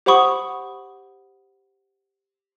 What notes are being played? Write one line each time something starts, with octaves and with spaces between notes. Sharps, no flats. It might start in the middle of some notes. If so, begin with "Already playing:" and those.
G4 C5 F#5 B5 C#6 D#6